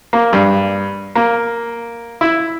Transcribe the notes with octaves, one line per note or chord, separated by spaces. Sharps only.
A#3
G2
A#3
E4